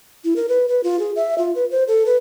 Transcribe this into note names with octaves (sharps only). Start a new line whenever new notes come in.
E4
A#4
B4
B4
F4
G#4
E5
F4
B4
C5
A4
B4